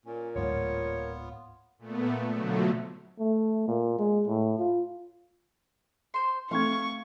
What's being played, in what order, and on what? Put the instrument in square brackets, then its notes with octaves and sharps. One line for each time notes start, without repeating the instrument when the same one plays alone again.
[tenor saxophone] A#2 [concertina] C#4
[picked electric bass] D1 G#2 [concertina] B3 F4 [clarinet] C#5
[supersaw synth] A#2 A3 B3
B2 D3 F3 F#3 A3
[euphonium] A3
A#2
G#3
A2
F4
[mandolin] C5 C6
[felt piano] A3 C4 G#6 [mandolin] F5 [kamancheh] C#6